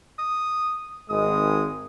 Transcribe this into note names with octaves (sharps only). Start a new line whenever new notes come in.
D#6
G#1 G#3 D#6